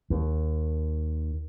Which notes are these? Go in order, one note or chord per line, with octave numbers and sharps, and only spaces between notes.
D#2